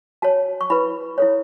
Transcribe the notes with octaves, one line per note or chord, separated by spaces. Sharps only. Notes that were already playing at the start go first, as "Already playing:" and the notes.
F#4 C#5 A5
C#6
E4 B4 B5
E4 A4 C#5